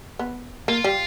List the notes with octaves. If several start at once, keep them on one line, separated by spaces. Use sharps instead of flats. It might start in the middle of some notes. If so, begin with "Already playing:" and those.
B3
A#3 F4
G3